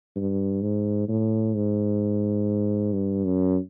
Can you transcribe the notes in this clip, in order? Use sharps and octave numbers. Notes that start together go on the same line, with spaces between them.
G2
G#2
A2
G#2
G2
F#2